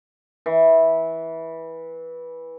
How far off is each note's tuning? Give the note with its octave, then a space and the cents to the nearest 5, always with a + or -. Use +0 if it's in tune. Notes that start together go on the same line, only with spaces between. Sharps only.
E3 -15